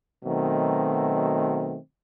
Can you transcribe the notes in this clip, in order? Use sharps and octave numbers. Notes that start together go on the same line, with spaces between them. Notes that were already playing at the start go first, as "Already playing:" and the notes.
B2 D#3 F#3 A3 C4